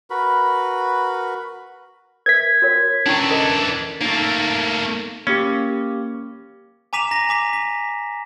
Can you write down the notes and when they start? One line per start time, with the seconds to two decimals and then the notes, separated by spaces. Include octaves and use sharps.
0.10 F#4 A#4 B4 B5
2.26 A#4 B4 E5 G#6 B6
2.62 F#4 A#4 C#5
3.06 E3 C#4 D4 E4 C#6
3.30 A4 A#4 D#5
4.01 A3 A#3 D#4
5.27 A#3 C#4 G4
6.93 G#5 A#5 D6 B6 E7 F7
7.11 A#5 A#6
7.29 G#5 D6 B6
7.53 B6